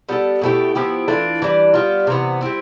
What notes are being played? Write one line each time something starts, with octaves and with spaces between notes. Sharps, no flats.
G3 B3 F4 A4
B2 A3 E4 G4
F3 B3 E4 G4
E3 A3 D4 F4
E3 G3 D4
G3 B3 F4
C3 E3 B3
G3 C4 E4